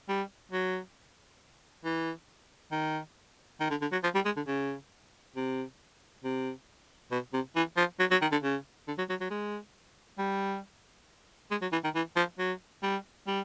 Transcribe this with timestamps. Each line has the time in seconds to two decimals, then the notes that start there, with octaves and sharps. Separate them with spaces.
0.09 G3
0.52 F#3
1.84 E3
2.72 D#3
3.60 D#3
3.70 D3
3.82 D3
3.92 F#3
4.03 F3
4.15 G3
4.25 G#3
4.36 D3
4.47 C#3
5.36 C3
6.24 C3
7.12 B2
7.33 C3
7.56 E3
7.77 F3
7.99 F#3
8.11 F#3
8.22 D#3
8.32 D3
8.43 C#3
8.88 D3
8.98 F#3
9.09 F#3
9.20 F#3
9.31 G#3
10.18 G3
11.51 G#3
11.61 F#3
11.72 E3
11.84 D#3
11.95 E3
12.16 F3
12.39 F#3
12.83 G3
13.27 G3